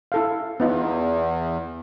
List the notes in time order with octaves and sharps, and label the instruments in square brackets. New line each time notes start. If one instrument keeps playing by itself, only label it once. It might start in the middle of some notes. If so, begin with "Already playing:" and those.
[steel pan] E4 A4 F5
[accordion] E2 [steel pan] B3 D#4 F4